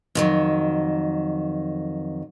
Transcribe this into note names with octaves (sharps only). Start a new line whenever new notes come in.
F2 D#3 F#3